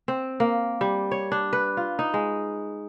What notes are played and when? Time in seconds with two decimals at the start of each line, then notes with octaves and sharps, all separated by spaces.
0.08 C4
0.40 A#3
0.81 G3
1.11 C#5
1.32 D4
1.53 B4
1.77 F4
1.99 D#4
2.14 G#3